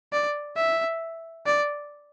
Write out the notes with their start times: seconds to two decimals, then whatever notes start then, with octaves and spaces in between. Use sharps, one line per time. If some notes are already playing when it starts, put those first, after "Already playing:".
0.13 D5
0.56 E5
1.46 D5